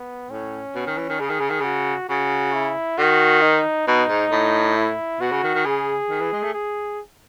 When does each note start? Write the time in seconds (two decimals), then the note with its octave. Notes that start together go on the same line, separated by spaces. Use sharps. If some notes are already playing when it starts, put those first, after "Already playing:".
Already playing: B3
0.30 A2 C#4
0.75 B2
0.87 D#3
0.97 E3
1.09 D#3
1.20 C#3 G#4
1.30 D#3
1.40 C#3
1.50 D#3
1.60 C#3 F#4
2.09 C#3 F#4
2.54 E4
2.98 D#3 F#4
3.42 D#4
3.87 B2 D#4
4.09 G#2
4.32 A2
4.76 E4
5.20 B2 F#4
5.32 C#3
5.43 D#3
5.55 D#3
5.65 C#3 G#4
6.10 D#3
6.21 E3
6.32 G#3
6.43 A3
6.54 G#4